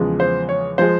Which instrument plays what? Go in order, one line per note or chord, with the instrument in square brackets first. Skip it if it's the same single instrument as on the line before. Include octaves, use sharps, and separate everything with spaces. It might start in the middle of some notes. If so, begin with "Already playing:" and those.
Already playing: [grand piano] E2 C#3 F3 G#3
C5
C#5
F3 G#3 C5